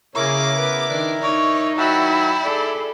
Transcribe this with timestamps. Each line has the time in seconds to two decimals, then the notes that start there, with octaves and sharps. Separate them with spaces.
0.16 C#3 A#3 E4 G#4 A#4 C#5 D6
0.58 B3 B4
0.90 D#3 D4
1.22 D#4 C#5 D5
1.78 D#3 F#3 E4 E5 F#5 G5 A5
2.43 G#4 A4 D5